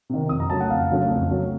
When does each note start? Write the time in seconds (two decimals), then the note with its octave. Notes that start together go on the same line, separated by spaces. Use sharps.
0.10 C3 D#3
0.29 F2 D#6
0.40 A#5
0.50 C#3 F#3 A3 C#4 A5
0.60 F#5
0.70 F2 F5
0.91 C#3 F#3 A3 C#4
1.11 F2
1.31 C#3 F#3 A3